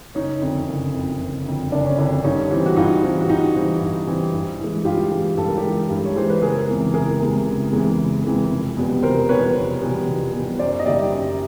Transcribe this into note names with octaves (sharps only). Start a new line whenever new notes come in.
F#1 C#4 D#4
F2 D3
F#1
F2 D3
F#1
F2 D3
F#1 D4
C#4
F2 D3 D4
G2 C#4 D#4
E3 G3 C4
F#4
G2 D#4 F4
E3 G3 C4
F#4
G2 D#4 F4
E3 G3 C4
G2
E3 G3 C4
G2
E3 G#3
G2 F4 G4
E3 G#3
G2 A4
A#4
G4 A4
E3 G#3
G2
C#5
E3 G#3 C5
B4
F#1 G#4 A#4
E2 C3 E3 G#3
F#1 G#4 A#4
E2 C3 E3 G#3
F#1
E2 C3 E3 G#3
F#1
E2 C3 E3 G#3
F1
E2 B2 G3 B3
F1 A#4 C5
E2 B2 G3 B3 B4 C#5
F1
E2 B2 G3 B3
F1
E2 B2 G3 B3
F#2 C5 D5
D#5
D#3 G3 A#3 D5 E5
F#2